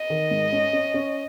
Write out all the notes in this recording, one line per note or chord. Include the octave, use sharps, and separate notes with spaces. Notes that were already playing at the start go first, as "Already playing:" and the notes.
Already playing: D#5
D#3
G#2
C#4
C#4
C#4